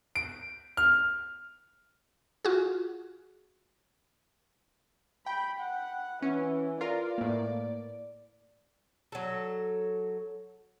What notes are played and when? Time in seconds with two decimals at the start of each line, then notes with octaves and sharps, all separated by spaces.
0.16 D7
0.77 F6
2.45 F4 F#4 G#4
5.26 G5 B5
5.59 F#5
6.22 E3 C#4
6.81 F4 A#4 D5
7.18 A2 A#3
9.12 F#3 A4